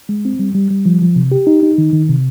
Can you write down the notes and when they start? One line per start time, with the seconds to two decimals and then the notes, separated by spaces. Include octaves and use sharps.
0.09 G#3
0.25 C4
0.39 G3
0.55 G3
0.71 G3
0.86 F3
1.02 F3
1.16 C3
1.32 G4
1.47 D#4
1.63 D#4
1.78 D#3
1.93 D#3
2.09 C3